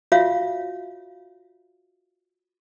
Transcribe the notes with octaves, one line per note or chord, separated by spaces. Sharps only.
F4 F#4 C#5 E5 F5